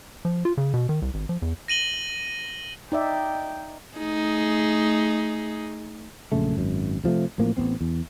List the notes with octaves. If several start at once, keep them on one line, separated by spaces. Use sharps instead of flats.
F3
F4
C#3
B2
D#3
C2
G#1
F3
E2
A#6 D#7 F#7 G7
D#4 D5 E5 G5
A3 D#4 G#4
A#1 F#2 C#3 A3
G#1 F#2
C3 F3 G#3 A3
A1 A2 F3 A#3
A1 D#3 B3 C4
E2